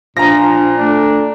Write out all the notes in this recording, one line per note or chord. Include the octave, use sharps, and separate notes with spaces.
A#2 F3 D4 A#5 A#6
A3 D4